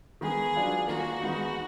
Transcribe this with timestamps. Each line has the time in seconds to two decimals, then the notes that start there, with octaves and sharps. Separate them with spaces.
0.21 D#3 G#3 B3 G#4
0.54 F#3 D4 F4 B4
0.88 D#3 A#3 F4 F#4 A#4
1.22 D#3 G#3 B3 D#4